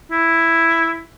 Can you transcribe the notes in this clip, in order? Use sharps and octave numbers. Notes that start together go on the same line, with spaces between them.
E4